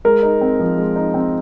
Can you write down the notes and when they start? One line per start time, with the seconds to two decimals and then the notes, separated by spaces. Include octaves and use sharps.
0.05 G#3 A#4
0.23 D#4
0.41 C4
0.59 F3
0.78 G#3
0.96 D#4
1.14 C4